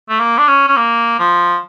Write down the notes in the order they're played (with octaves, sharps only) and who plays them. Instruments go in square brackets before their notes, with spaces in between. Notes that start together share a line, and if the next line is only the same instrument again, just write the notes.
[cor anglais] A3
A#3
D4
C#4
C#4
A#3
F3